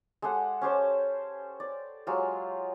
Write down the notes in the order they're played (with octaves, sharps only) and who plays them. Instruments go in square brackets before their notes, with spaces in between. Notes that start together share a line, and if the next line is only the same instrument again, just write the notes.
[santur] G#3 G4 A4 F#5
C#4 G4 C5 A5
D5
F#3 G#3 F4 G4